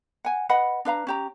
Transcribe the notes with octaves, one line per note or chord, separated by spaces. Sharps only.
F#5 G#5
B4 D#5 F#5 B5
D4 B4 F5 A#5
C#4 G4 A#5